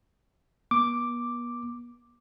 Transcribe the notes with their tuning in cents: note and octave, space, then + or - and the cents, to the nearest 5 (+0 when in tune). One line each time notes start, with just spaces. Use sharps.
B3 -40 D6 +0